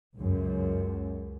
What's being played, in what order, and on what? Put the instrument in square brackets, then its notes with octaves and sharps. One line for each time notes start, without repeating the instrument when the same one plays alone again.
[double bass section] C#2 F#2